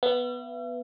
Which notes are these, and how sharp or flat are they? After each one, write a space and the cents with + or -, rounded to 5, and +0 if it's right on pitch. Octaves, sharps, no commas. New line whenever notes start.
B3 +0 E5 +45